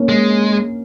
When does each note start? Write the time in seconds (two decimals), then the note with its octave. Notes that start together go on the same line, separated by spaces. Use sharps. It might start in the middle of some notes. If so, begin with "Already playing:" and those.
Already playing: A#3 C#4
0.09 G#3